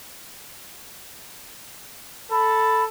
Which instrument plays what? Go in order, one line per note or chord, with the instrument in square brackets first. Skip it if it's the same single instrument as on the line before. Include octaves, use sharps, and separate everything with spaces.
[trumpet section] A4 [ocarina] B5